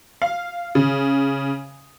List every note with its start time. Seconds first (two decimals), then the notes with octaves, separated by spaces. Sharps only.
0.22 F5
0.75 C#3